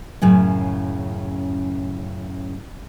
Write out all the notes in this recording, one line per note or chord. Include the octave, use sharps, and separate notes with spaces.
F#2 A2 C#3